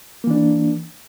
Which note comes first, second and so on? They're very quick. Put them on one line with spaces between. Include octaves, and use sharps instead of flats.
A#3 E3 D4